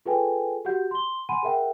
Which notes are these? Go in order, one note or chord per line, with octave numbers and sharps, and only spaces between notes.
F4 G#4 A4 B4 G5 G#5
F#4 G4 F#5 G6
C6 G7
F#5 G#5 B5 C6 D#7
G#4 A#4 E5 F#5 G5